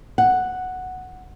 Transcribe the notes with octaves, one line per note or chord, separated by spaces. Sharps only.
F#5